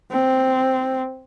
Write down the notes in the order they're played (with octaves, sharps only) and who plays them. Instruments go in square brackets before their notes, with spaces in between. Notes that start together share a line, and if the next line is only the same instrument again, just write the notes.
[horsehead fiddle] C4